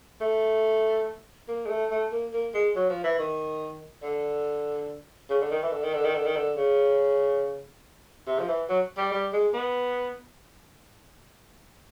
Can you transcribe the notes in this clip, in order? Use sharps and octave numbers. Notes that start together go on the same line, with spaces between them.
A3
A#3
G#3
A3
A3
A#3
A#3
G#3
F#3
F3
E3
D#3
D3
C#3
D3
D#3
E3
D3
D#3
D3
D#3
D3
D#3
D3
C#3
C3
F3
E3
F#3
G3
G3
G#3
B3